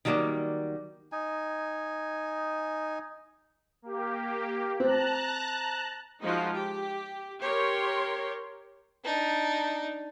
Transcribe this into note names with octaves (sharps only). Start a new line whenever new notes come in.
D#3 F#3 G3 A3 A#3
D#4 G#5
A#3 G4
C4 A5 A#5 F#6
F3 G#3 D#4 F4 F#4
G4
G4 A#4 C#5 C6
D4 D#4